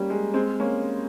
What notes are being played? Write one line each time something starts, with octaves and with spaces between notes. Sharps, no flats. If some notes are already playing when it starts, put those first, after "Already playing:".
Already playing: G3 A#3 C#4
G#3
G#3 C4
A#3 C#4